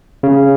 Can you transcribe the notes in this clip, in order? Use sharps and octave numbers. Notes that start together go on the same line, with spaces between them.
C#3